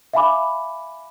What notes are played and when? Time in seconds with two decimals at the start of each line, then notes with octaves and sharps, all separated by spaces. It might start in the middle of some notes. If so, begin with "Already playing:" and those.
0.13 E5 F5 G#5 B5 D6